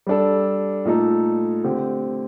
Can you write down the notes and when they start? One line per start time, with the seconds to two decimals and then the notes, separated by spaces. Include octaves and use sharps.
0.07 G3 D4 A4
0.85 A#2 A3 D#4 A4
1.64 D3 A3 C4 G4